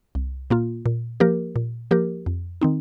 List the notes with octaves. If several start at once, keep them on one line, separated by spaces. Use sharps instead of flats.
C2
A#2 A#3 F4
A#2
F3 A#3 G4 A#4
A#2
F3 A#3 G4 A#4
F2
D#3 C4 D#4